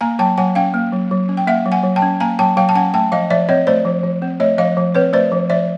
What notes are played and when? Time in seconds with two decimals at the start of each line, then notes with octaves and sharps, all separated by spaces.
0.01 A#3 G#5 A#5
0.19 F#3 G5 A5
0.38 F#3 F#5 G#5
0.55 C#4 F5 G5
0.74 A#3
0.93 F#3
1.11 F#3
1.29 C#4
1.37 G5
1.47 A#3 E5 F#5
1.66 F#3
1.72 F#5 G#5
1.83 F#3
1.96 G5 A5
2.02 C#4
2.20 A#3 G#5 A#5
2.39 F#3 G5 A5
2.57 F#3 F5 G5
2.69 A5
2.75 C#4 F#5 G#5
2.94 A3 G5 A5
3.12 F3 D#5 F5
3.30 F3 D5 E5
3.49 C4 C#5 D#5
3.67 A3 C5 D5
3.85 F3
4.03 F3
4.22 C4
4.40 A3 C#5 D#5
4.58 F3 D#5 F5
4.77 F3
4.95 C4 B4 C#5
5.13 A3 C5 D5
5.32 F3
5.50 F3 D5 E5